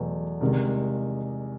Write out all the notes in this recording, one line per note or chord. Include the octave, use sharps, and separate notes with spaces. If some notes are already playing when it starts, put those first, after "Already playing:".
Already playing: E2 B2 F#3 A3
C2 C3 D#3 G#3